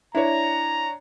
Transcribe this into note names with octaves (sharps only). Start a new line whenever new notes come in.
D4 E4 C#5 A#5